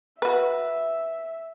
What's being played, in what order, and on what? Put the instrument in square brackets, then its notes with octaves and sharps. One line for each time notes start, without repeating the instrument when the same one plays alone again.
[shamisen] F#4 B4 [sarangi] E5